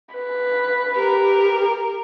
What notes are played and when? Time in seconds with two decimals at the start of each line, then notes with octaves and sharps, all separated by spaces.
0.15 B4
0.96 G4 A#4